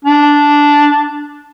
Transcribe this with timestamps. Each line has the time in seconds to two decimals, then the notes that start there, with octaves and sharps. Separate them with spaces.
0.05 D4